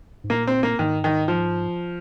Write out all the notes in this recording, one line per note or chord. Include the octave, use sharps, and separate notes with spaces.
G#2
A#2 A#3
C4
A#3
G#2 D#3
D#3
F3